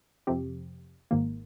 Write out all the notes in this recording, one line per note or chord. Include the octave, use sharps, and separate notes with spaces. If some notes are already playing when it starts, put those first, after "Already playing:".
F2 C3 F3 C4 G4
G#1 G#2 D#3 A#3